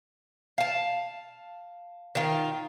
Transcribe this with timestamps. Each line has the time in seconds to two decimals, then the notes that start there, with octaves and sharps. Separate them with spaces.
0.58 F5 A5
2.15 D#3 F4